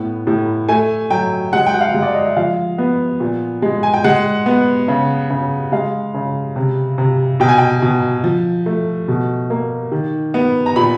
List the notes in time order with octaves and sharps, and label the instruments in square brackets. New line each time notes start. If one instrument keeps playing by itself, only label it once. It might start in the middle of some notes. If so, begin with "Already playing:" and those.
Already playing: [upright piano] A2 B3
A2
A3 G#5
F#3 G5
G#3 F#5
G5
F#5
F5
G#3
D5
D#5
E5
F3 F5
B3
A#2
G#3
G#5
G5
G#3 F#5
B3
C#3
C#3
G#3 F5
C#3
C3
C3
B2 G5
G#5
G5
B2
F3
A3
B2
A#3
D#3
B3
A#5
A#2 B5